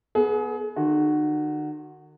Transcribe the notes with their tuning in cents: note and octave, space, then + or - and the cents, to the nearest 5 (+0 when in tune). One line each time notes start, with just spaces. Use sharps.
B3 -15 G#4 +30
D#3 -45 F#4 +0